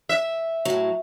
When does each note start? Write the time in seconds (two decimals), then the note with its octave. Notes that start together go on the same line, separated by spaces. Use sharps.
0.09 E5
0.65 A2 F#3